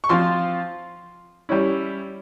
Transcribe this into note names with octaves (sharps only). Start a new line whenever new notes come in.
C#6
F3 C4 F4 C6
G3 C#4 E4